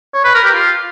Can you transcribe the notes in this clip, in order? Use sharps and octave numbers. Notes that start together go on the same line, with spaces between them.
C#5
B4
A#4
G4
F4